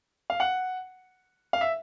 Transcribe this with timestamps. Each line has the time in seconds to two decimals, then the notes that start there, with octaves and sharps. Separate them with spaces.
0.30 F5
0.40 F#5
1.53 F5
1.61 E5